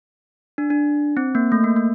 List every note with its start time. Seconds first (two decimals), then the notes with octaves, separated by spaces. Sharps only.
0.58 D4
0.70 D4
1.17 C4
1.35 A#3
1.52 A3
1.64 A#3
1.76 A#3